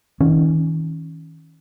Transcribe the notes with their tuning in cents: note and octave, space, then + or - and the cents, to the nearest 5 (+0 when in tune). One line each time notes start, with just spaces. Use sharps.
D#3 +45 C#4 +0